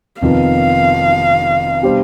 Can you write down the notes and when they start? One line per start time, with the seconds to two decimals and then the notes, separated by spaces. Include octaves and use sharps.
0.21 F1 F2 D#3 B3 F4 F5
1.82 B2 G3 D4 G4 C5